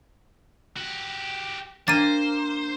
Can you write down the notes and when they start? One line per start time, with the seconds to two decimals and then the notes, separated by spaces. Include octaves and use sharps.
0.77 F#4 G4
1.88 A#3 D4 C5 A6 D#7